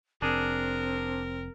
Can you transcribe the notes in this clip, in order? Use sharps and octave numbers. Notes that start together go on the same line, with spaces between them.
F1 C4 D4 G#4 A#4